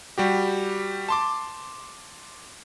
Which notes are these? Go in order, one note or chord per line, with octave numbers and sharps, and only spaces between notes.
G3 F#4 G4
A5 C6 D6